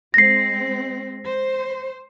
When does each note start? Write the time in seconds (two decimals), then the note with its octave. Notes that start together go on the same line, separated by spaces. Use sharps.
0.14 G#3 C4 A#6 C7
1.25 C5